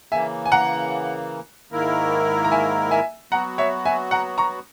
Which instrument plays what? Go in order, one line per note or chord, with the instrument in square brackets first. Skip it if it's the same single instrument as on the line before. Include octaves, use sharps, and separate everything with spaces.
[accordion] C#3 E3 A#3 [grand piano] E5 G#5
[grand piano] G#5
F#5 A#5
[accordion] G#2 D#3 A#3 E4 A#4
[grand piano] A#5
E5 G#5
E5 G#5
[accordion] F#3 B3 F#4 [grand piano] F#5 A#5
[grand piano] C#5 E5
E5 G#5
F#5 A#5
A#5 C#6